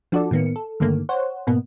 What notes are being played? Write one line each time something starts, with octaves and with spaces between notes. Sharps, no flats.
F3 D4 F#4 A4 D5
A2 D#3 A#3 B3 C#7
A4
G2 D3 D#3 A3 A#3
C5 C#5 F#5
G#2 B2 A#3 B3